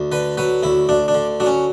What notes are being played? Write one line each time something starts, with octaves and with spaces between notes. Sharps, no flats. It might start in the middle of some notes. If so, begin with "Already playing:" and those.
Already playing: D2
D3 B4
F#3 B4
D2 E4
D2 D4
D4
D3
F#3 D4
C#4